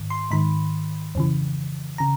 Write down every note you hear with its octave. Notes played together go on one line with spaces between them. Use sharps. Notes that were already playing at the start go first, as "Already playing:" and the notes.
Already playing: G#2 D#3
C6
G#2 D#3 B5
F2 C#3 E3
C#3 A#5